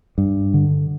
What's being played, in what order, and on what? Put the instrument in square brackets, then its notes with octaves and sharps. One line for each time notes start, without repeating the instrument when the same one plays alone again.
[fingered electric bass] G2
D3